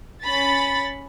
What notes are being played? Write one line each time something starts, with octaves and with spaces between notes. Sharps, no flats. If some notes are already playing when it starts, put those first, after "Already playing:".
C#4 B5 A6